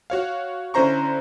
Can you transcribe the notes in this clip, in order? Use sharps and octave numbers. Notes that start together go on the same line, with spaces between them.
F#4 C#5 F5
D3 C#4 E4 C5 A#5 C#6